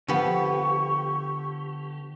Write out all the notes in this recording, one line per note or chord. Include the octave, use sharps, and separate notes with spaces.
D3 F3 B3 G4 C#6